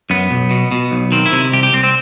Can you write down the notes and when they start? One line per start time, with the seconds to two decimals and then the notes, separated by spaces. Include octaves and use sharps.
0.10 F#2 B3
0.31 B1
0.51 B2
0.72 B2
0.91 B1
1.12 D#3 C4
1.26 E4
1.32 C3
1.52 C2 G4
1.63 G4
1.73 C2 C4
1.83 C4